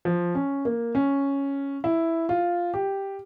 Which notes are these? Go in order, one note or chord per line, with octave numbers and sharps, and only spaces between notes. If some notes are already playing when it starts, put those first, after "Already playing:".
F3
C#4
A#3
C#4
E4
F4
G4